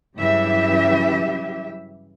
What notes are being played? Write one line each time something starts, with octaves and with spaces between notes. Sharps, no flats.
G2 C#3 E3 F#3 G4 E5